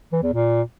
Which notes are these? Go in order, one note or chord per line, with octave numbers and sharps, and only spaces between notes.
E3
E2
A#2